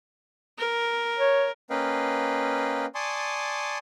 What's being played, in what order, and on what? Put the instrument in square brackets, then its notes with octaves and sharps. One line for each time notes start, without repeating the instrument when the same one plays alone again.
[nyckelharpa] A#4
[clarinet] C#5
[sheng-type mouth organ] A#3 C#4 B4 D#5 F5 G5
D5 G#5 A5 C6 C#6 D#6